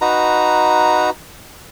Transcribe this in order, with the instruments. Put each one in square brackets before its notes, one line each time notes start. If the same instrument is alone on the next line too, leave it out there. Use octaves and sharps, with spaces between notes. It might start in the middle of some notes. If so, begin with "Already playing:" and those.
[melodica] D#4 F#4 B4 A#5